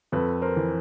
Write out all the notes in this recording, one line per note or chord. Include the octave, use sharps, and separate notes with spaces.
F2 A4 B4
A#4 C5
E3